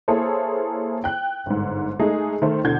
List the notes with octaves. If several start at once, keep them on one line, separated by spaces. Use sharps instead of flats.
A#3 E4 G#4 A4 C5 C#5
G5 F#6
G1 G#2
G#3 A3 D#4 G#4
D#3 A3 C5
E2 B2 D3 G6 G#6